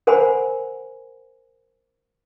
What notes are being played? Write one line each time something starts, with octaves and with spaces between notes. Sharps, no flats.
A#4 C5 F#5 G#5 A#5 B5